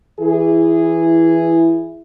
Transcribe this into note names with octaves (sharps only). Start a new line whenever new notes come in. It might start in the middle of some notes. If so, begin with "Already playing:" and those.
E3 E4 G#4